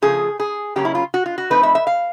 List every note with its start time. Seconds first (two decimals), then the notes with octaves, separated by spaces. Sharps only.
0.02 C#3 F3 A3 G#4
0.40 G#4
0.76 C#3 F#3 A#3 C#4 G4
0.85 E4
0.95 F4
1.14 F#4
1.26 F4
1.38 F#4
1.50 F3 A3 C4 D#4 B4
1.63 E5
1.75 E5
1.87 F5